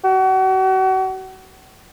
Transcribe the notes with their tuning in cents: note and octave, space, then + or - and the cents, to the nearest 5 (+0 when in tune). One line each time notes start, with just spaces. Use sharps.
F#4 +35